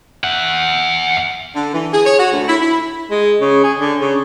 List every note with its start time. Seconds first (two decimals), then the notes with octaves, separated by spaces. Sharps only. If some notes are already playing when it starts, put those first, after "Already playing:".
0.24 E5 F#5
1.55 D3
1.73 E3
1.93 G#4
2.05 C#5
2.19 F#4
2.32 D2
2.48 E4
2.61 E4
3.11 G#3
3.41 C#3
3.64 G#4
3.79 D3
4.00 C#3